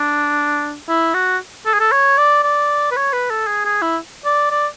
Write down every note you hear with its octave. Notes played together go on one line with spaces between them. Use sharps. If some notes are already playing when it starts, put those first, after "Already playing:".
Already playing: D4
E4
F#4
A4
G#4
A4
C#5
D5
D5
B4
C#5
B4
A4
G#4
G#4
E4
D5
D5